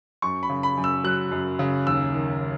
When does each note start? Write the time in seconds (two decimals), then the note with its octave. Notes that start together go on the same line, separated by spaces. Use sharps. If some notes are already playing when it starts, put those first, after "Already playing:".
0.22 F#2 C#6
0.43 B5
0.49 C#3
0.63 B5
0.77 F#2
0.84 E6
1.04 F#3 F#6
1.32 F#2
1.59 C#3
1.86 D#2 E6
2.14 D#3